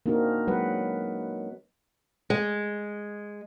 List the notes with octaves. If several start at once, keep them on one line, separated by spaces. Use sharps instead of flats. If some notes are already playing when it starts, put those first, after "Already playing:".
A#3 C4 D4 D#4 F#4 A#4
F#3 G#3 B4 F#5
G#3